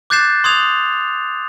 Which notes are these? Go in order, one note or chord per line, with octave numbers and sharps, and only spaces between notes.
D6 F#6 G6 A6 C7 E7
C6 D#6 G#6 F7